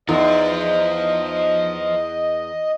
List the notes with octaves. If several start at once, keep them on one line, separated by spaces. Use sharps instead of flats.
E2 D#4 F4 C5 D#5